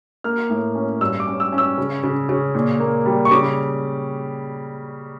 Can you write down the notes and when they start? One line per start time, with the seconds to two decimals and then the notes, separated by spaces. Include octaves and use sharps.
0.24 A#3 F6
0.50 A2
0.75 C#4
1.01 G2 E6
1.20 D6
1.27 C#4
1.40 E6
1.52 C#4
1.58 E6
1.78 C#3
2.03 C#3
2.29 C#3
2.55 A#2
2.80 A#3
3.06 G3
3.25 C#6
3.31 C#3 D6